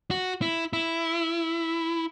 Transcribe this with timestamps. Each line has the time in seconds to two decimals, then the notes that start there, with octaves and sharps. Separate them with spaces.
0.11 F#4
0.42 E4
0.73 E4